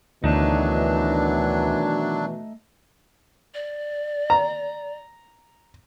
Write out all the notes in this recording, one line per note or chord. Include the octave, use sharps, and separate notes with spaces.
D2 B2 D#3 E3 F#3 A3 D4 D#4
D5
A#5